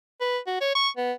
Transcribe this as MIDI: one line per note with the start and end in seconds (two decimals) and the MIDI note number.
0.21 0.38 71
0.47 0.57 66
0.61 0.72 73
0.75 0.89 85
0.97 1.13 59